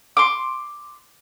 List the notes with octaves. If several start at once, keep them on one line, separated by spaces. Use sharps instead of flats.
C6 D6